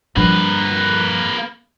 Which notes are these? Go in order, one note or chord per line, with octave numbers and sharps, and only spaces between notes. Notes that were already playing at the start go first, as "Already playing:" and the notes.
G2 F3 A#3 B4